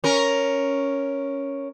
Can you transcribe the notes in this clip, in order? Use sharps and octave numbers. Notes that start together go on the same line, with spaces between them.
C#4 A#4